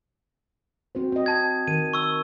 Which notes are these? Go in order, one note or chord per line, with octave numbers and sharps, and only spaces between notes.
C4 F#4 C5
C4 D#5
A5 G#6
D#3 D#7
C#6 E6